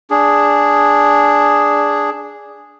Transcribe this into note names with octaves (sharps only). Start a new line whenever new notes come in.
D4 G#4